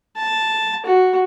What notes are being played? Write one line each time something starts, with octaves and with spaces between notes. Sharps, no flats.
A5
F#4